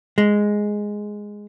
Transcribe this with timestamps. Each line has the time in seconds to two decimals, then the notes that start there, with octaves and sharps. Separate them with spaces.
0.18 G#3